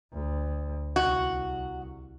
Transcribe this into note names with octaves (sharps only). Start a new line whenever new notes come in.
D2
C2 F#4